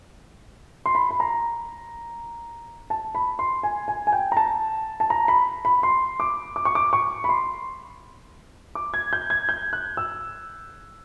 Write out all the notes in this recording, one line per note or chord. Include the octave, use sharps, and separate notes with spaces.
C6
B5
B5
A#5
A5
B5
C6
G#5
G#5
G#5
G5
A#5
A5
A5
A#5
B5
B5
C6
D6
D6
C#6
D6
C#6
B5
C6
D6
G#6
G6
G#6
G6
F#6
E6